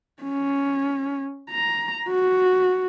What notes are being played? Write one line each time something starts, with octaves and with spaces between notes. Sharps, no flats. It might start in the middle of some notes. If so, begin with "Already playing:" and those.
C#4
A#5
F#4